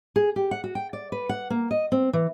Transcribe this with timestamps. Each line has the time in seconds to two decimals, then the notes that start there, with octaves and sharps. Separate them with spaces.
0.16 G#4
0.36 G4
0.51 F#5
0.64 F#4
0.75 G5
0.93 D5
1.12 B4
1.29 F#5
1.50 A#3
1.71 D#5
1.92 C4
2.13 E3